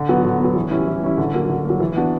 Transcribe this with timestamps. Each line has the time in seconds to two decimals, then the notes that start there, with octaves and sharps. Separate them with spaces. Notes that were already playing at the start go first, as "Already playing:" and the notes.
Already playing: D3
0.09 F#3 B3
0.24 D3
0.40 F#3 B3
0.56 E3
0.71 G3 C#4 E4
0.87 E3
1.02 G3 C#4 E4
1.18 D3
1.34 F#3 A#3
1.49 D3
1.65 F#3 A#3
1.80 E3
1.97 B3 D4 F#4